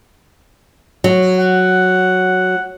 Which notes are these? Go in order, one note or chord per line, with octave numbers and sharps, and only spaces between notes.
F#3
F#5